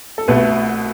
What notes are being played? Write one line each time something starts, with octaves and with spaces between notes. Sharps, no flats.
A4
C2 B2 A3 B4